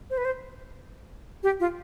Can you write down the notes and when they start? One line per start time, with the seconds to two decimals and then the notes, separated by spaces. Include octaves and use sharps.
0.10 C5
0.18 B4
0.25 C5
1.43 G4
1.60 F4